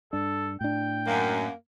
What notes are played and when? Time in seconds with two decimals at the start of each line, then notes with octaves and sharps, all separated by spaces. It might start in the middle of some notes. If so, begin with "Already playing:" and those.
0.13 G2 D4 A4
0.61 A2 D4 G5
1.06 F#2 A#3